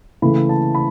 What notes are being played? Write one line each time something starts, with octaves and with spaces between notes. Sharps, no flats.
C#3 E3 A3 B5
A5
B5